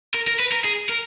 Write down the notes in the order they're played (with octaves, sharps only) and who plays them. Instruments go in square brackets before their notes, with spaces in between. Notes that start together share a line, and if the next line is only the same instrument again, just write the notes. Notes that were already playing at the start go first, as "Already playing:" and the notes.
[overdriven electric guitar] A#4
A#4
B4
A#4
G#4
A#4